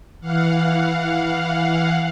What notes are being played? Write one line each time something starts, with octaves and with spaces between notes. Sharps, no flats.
E3 F5 F#5